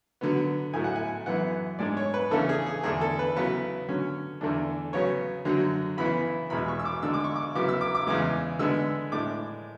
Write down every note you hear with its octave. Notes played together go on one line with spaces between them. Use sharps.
D3 F#3 B3
A2 F#3 A3 E4 G#5
F#5
G#5
F#2 E3 B3 F#5
G#2 G#3 D4 D5
C#5
B4
C#3 E3 A3 D4 A4
G#4
G#4
E2 D3 A3 D4 G#4
A4
B4
C#3 F#3 B3 E4 B4
D3 F#3 C#4
E2 D3 A3 D4
C#3 F#3 B3 C#5
F#2 D3 F#3
C#3 E3 B3 E4 B5
E2 B2 G#3 B5
C#6
E6
D6
D3 G#3 D4 E6
D6
C#6
D6
C#3 F#3 B3 E4 D6
E6
D6
D6
E2 C#3 E3 G#3 D6
D3 G#3 B3 D4 E6
A2 G#3 D4 D6